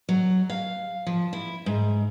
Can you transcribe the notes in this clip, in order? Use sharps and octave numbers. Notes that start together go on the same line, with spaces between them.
F#3
F5
F3
E4
G#2